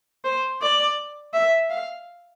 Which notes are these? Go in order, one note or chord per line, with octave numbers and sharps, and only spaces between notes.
C5
D5
E5
F5